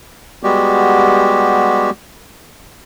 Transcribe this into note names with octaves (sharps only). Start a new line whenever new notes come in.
G3 G#3 B3 F#4 G4